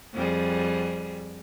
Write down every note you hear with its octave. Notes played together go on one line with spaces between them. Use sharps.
F2 G3 G#4